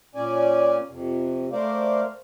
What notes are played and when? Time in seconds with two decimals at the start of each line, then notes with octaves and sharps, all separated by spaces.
0.15 A#2 C#4 D5 G#5
0.90 F2 C3
1.52 A3 A#4 C5 D5 F5